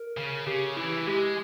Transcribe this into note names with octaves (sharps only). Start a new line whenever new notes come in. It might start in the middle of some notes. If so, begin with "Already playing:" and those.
Already playing: A#4
C#3
C#3 G4
E3 E4
G#3 G4